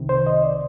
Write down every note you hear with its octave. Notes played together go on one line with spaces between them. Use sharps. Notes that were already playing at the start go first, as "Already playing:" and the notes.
Already playing: C2 C3 D#3
C5
D#5
D5